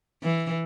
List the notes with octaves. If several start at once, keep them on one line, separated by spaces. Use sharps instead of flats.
E3